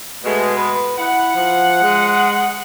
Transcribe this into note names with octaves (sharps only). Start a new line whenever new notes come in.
B2 G#3 A3
B4
E4 F#5
F3
G#3